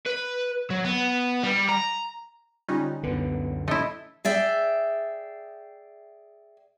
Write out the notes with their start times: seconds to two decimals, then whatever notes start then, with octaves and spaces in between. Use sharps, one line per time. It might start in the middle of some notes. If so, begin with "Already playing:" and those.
0.06 B4
0.70 F#3
0.85 B3
1.43 G3
1.69 A#5
2.68 D3 G3 C#4 D#4 F4 F#6
3.03 C#2 F#2 D3 B3 B4
3.68 A3 E4 D#5 C6
4.25 G#4 D5 E5 G5